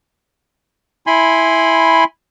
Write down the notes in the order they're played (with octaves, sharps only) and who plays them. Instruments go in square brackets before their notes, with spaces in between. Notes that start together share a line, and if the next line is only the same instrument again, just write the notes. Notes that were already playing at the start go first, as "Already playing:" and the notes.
[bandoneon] E4 G#5 B5 C6